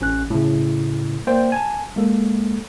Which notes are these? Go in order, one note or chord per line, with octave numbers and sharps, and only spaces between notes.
A1 C#4 F#6
A2 C#3
A#3 C5 D5 G5
G#5 A5
G#3 A#3 A4